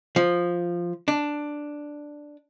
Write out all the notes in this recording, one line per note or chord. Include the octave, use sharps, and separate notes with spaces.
F3
D4